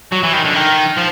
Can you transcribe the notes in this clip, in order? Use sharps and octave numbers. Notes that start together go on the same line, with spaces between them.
F#3
E3
D#3
D3
D#3
F3